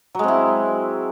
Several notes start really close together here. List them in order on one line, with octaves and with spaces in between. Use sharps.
F#3 G#3 C4 E4